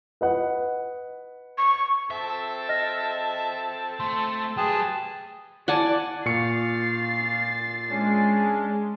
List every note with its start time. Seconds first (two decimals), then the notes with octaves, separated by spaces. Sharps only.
0.21 B4 D#5 F#5
1.58 C#6
2.10 C4 A4 E5 A5
2.69 D#5 F6 A#6
4.00 A3 C6
4.57 F#3 G3 G#4 B4 G5 A5 C6 D#6
5.68 E4 D5 F#5 G#5 A5
6.26 A#2 F5 C#6 A6 C7 C#7
7.90 G#3 C#4 D4 A5